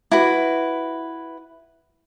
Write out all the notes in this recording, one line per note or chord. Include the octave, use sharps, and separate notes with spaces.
E4 F#4 B4